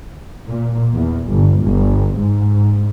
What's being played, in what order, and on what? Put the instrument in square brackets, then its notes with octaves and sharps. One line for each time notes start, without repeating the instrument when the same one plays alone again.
[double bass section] A#2
E2
G1
G1
G#2